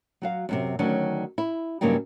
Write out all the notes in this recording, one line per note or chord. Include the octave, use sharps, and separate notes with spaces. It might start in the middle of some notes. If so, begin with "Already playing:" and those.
F#3 F#4 F5
F#2 A2 C3
D2 D#3 F#3 C#4 D4
E4
G2 C#3 F#3 A#3 D#4 G4